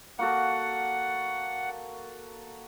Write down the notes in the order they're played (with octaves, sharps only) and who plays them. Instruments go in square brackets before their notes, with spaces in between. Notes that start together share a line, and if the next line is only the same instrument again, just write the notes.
[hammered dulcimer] A#3 F#4 A4 [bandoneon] F#5